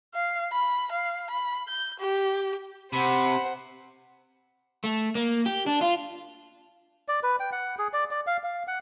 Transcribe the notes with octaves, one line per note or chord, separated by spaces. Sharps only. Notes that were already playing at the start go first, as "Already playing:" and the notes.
F5
B5
F5
B5
G6
G4
C3 C5 F#5 B5
A3
A#3
G4
D4
F4
D5
B4
G5
F#5
G#4
D5
D5
F5
F5
F#5